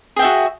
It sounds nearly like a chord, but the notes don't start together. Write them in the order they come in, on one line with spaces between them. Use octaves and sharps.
G#4 G5 E5 F#4